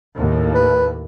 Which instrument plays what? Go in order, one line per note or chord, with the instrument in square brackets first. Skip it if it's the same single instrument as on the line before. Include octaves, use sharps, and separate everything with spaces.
[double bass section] D#2 A2
[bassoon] B4